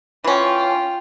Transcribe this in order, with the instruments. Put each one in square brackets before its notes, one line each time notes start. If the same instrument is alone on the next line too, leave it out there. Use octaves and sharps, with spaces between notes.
[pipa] E3 C#4 [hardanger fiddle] F4 G5